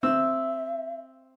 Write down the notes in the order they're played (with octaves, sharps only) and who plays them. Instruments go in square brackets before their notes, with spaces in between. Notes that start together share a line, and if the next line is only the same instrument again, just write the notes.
[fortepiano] C4 [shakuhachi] E5 [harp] E6